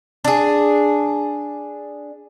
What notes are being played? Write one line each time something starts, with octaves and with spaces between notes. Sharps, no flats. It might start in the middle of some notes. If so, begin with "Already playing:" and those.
D4 G#4